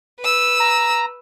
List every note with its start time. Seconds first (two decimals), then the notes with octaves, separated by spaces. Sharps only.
0.21 B4 E6
0.60 A#5